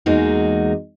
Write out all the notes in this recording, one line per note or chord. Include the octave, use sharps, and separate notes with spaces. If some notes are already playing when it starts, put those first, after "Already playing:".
E2 G#3 A#3 D#4 F#4